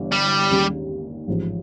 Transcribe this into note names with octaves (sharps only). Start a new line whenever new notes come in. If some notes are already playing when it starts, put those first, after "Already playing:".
Already playing: G1 G2 E3
G3
D#2 D#3 G#3 C#4
A1 G#2 F3